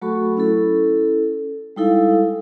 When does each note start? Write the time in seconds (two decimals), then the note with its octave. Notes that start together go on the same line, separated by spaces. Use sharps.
0.02 F#3 A3 F#4 A4 B5 C#6
0.37 C#4 E4 A4
1.76 G3 G#3 D#4 E4 A4 F5